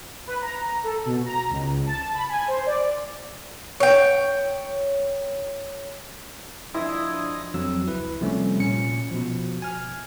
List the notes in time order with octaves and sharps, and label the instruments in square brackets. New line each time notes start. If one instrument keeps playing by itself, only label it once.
[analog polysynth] B4
A#5
A4
B2
A#5
C#2
A5
B5
G#5
C5
D5
[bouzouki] C#5 G5
[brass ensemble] F3 D4 [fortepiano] E4 [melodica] D#5 D#6 [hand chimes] C6 E6 G#6
[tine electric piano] F2 F#3 E6
C#2 E4 B4
C3 F3 G3 A3 C#4
A#2 C#4 C#7
B2 F3
G#5 F6